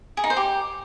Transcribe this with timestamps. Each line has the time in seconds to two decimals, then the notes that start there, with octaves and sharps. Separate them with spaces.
0.17 G#4
0.24 D#4
0.30 C5
0.37 G4